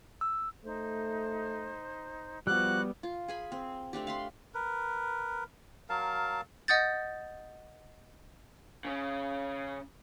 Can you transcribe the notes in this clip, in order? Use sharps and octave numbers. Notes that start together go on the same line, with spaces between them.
E6
A3 D#4 C5
F3 G3 B3 F#4 F#5 D6 F#6
F4
G#4 G#5 B5
C4
A3 C4 D4 G4
F5 B5 C6
A#4 B4
F#3 A#4 F5 A5
D#5 F#5 D#6 G6 A6
C#3 C#4